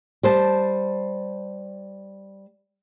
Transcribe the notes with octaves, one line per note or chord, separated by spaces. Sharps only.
G3 C5 A5